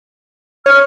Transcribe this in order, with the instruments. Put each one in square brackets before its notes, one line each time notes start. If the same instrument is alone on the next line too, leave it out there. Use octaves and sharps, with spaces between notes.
[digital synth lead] C#5 [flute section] F6